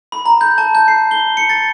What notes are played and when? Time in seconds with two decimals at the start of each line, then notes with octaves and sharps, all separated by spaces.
0.12 B5
0.26 A#5
0.41 G6
0.58 A5
0.75 G6
0.88 C7
1.11 G7
1.37 C#7
1.49 A6